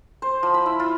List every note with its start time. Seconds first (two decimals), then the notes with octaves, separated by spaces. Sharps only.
0.22 C5
0.43 F3
0.54 B5
0.66 E4
0.80 F4